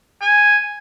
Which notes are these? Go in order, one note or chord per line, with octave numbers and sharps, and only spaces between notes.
G#5